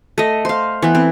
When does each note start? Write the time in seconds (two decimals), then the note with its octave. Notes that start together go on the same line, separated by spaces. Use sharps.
0.18 A3 D#5
0.45 C5 F5
0.82 E3 B3
0.95 C4